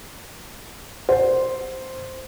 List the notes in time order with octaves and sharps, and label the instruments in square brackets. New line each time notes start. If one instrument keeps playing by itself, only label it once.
[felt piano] C5